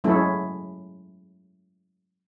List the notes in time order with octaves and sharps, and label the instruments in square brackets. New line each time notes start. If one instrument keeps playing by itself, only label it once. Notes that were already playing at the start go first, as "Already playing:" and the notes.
[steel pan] F#3 G#3 A3 C#4 E4 A4